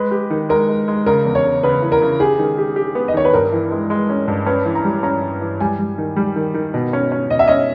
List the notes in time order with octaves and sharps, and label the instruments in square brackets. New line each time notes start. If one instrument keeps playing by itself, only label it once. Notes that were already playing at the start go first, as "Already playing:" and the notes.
Already playing: [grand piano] G#3 [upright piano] B4
[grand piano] G4
D#3
[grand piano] G#3 [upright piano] A#4
[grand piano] G#3
G#3
[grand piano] C#3 [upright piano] A#4
[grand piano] E2
[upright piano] C#5
[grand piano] C#3
[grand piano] C#3 [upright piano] B4
[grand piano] E3
[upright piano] A#4
[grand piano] C#3
[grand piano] G4 [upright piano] G#4
[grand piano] D#3
G4
G4
B3
[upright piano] D#5
[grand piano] D#3 [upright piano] C#5
[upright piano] B4
[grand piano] G2 [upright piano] A#4
[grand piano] E3
G#3
G#3
C#4
G2
[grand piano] C#4 [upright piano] B4
[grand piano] E3
[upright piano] A#5
[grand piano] G3
[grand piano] C#4 [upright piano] A#5
[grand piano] E3
E3
[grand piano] G3 [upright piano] G#5
[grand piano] G3
D#3
G3
D#3
D#3
B2
C#4
C#4
[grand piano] B2 [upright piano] D#5
[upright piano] E5
[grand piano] C#4 [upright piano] D#5